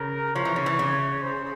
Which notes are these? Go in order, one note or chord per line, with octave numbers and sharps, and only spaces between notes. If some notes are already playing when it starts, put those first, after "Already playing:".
Already playing: C#3 A#4
F3 C#5
E3
C#3
E3
C#3
C5